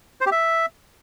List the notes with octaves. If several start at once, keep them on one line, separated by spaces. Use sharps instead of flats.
C5
G4
E5